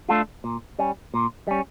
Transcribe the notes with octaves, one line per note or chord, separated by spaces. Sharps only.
A3 D4 F4 A4
A#2
G3 C#4
A#2
G3 C#4